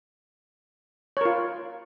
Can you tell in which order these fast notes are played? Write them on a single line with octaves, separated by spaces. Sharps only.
C#5 A#4 F4